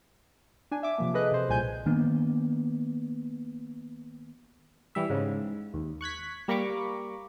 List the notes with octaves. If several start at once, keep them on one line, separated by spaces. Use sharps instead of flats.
D4 G#5
E5 D6
C3 F3 A#3
G#4 A4 B4 D#5 F#6
C3 C5
C2 A#2 G#5 G6
D#3 A#3 B3 D4
E3 G3 E5
G#2 C#3
D#2
C#6 F#6 G#6 B6
G3 A#3 A#5 B5 C#6 D6